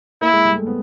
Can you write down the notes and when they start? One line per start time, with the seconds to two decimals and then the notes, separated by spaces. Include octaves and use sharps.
0.21 A#3 E4
0.33 G#3
0.45 G3
0.56 A3
0.67 B3